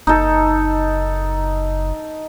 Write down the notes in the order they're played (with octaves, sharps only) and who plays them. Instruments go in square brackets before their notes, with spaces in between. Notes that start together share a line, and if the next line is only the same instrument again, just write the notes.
[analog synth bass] F#1 [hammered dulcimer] D#4 A4